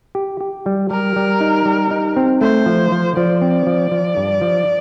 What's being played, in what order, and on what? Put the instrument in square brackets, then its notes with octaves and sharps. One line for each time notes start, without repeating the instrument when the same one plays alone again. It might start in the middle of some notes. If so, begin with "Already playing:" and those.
[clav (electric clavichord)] G4
G4
G3
[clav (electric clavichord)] G3 [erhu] A#4
[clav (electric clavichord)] G3
D#4
G3
D#4
C4
[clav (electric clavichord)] A3 [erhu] C5
[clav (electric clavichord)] F3
F3
[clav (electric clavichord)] F3 [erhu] D5
[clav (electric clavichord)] C4
F3
F3
G2
F3